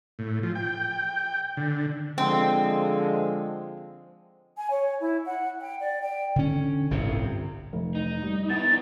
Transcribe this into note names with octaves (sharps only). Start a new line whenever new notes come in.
A2
F3
G5
D3
D3 F3 G#3 C4
G#5
C#5
E4
F#5
G5
D5
G5
D3 C#4
G1 C2 A2 C3
F1
D#4
G3
D#3 B3 E4 A6